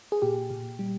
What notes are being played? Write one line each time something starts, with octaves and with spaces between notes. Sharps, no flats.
G#4
A#2 G4
A#2
G3